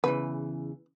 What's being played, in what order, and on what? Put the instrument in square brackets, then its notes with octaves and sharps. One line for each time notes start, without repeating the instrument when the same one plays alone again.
[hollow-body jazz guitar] E2 C#3 E3 [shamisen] B4